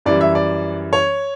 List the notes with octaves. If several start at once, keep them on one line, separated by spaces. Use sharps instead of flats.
F#2 E3 G3 D5
E5
D5
C#5